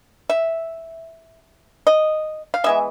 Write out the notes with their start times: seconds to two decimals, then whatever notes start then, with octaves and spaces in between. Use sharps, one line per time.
0.30 E5
1.87 D#5
2.54 F5
2.64 E3 G#3 B3 E5